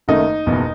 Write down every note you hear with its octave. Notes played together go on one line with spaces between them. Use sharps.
F#1 F#2 D#3 A3 D#4
F#1 E2 B2